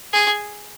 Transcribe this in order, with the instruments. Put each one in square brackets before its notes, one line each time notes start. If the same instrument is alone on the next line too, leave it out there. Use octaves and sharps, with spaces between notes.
[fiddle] G#4